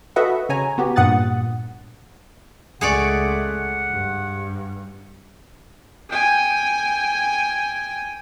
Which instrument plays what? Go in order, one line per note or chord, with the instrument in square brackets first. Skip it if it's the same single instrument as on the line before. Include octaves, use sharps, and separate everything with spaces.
[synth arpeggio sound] F#4 A4 B4 D#5 E5 F#5
C#3 C#5 G#5 A#5
B3 F#4 G4
G2 A#2 F#5 D#6 F#6 A6
[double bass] C#2 A3 [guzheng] G#4 C#5 D5 [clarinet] F#5
[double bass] G2
[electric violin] G5 G#5